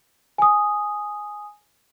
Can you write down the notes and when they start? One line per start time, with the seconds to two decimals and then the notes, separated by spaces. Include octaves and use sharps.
0.38 G#5 D#6